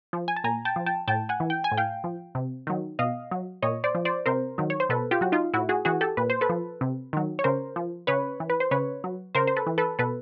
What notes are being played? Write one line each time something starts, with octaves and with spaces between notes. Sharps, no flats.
F3
G#5
A5
A#2 G#5 A#5
G5 A5
F3
G5 A5
A2 G5 A5
F#5 G#5
E3
G5
G#5
A2
F5 G5
F3
C3
D#3 F#3
B2 D#5 F5
F#3
A#2 C#5 D#5
C5 D5
F3
C5 D5
C3 A#4 C5
D#3 F#3
C#5
C5
B2 A4 B4
F4 G4
F#3 F#4
D#4 F4
A2 E4 F#4
F#4 G#4
E3 F#4 G#4
G4 A4
A#2 B4
C5
A4 B4
F3
C3
D#3 F#3
C#5
C#3 A#4 C5
F3
C#3 B4 C#5
E3
B4
C5
C#3 B4 C#5
F#3
C#3 A#4 C5
C5
A4 B4
E3
A4 B4
B2 A4 B4